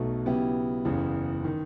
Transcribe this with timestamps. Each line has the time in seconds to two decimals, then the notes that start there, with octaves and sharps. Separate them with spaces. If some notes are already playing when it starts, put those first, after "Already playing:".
Already playing: B1 B2 F#3 A3
0.26 C#3 F#3 B3 E4 G4
0.85 F#1 E2 C#3
1.44 D#3